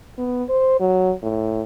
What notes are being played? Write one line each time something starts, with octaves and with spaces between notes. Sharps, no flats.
B3
C5
F#3
A2